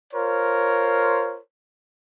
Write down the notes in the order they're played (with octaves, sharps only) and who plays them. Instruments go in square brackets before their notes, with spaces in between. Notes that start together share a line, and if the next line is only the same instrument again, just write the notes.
[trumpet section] F4 A#4 C5 C#5